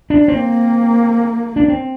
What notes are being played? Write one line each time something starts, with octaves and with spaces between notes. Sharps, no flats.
D4
A#3 C4
D4
C4